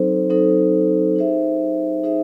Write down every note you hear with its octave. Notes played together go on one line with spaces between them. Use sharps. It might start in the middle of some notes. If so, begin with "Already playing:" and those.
Already playing: F#3 C4 D#4 A4 C5
F#3 C4 D#4 A4 C5
D#4 G#4 C5 E5
D#4 G#4 C5 E5